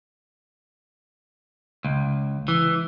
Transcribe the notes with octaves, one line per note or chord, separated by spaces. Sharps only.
C#2
E3